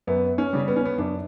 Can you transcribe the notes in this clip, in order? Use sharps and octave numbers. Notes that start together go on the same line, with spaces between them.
F#2 B3
C#4
C#3 G3
B3
C#4
B3
F#2 D4